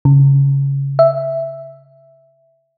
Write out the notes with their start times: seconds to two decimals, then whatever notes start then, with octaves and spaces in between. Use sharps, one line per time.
0.05 C#3
0.99 E5